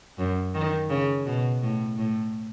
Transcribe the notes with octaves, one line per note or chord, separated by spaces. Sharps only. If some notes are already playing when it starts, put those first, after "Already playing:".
F#2
D#3
C#3
B2
A2
A2